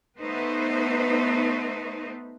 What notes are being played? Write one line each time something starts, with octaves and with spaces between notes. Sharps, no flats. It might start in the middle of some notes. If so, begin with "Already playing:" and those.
A3 B3 D#4 B4 C5